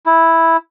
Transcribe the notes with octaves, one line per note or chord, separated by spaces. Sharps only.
E4